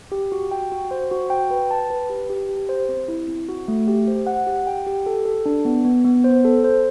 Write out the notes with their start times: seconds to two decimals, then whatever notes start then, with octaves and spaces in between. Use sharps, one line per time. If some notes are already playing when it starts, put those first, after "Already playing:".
0.12 G4
0.32 F#4
0.51 G5
0.72 F#4
0.91 C5
1.11 F#4
1.30 G5
1.51 B4
1.71 A5
1.90 B4
2.10 G4
2.30 G4
2.49 G4
2.69 C5
2.89 C4
3.08 E4
3.28 C4
3.49 F#4
3.68 A3
3.88 G4
4.08 C5
4.27 F#5
4.47 G4
4.67 G5
4.86 G4
5.06 A4
5.25 A4
5.46 D4
5.65 B3
5.85 B3
6.05 B3
6.24 C5
6.45 A4
6.64 C5